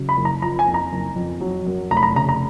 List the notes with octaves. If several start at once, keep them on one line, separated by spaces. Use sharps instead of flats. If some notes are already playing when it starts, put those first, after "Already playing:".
Already playing: C#3 F#3
B5
F#1
A#5
F3 A#5
G#5
F2
A#5
F#1
F2
F#3
F#2
F1 A#5
B5
A#5
C#3 A#5
A#5